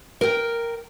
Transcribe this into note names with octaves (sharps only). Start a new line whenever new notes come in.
A#4 G5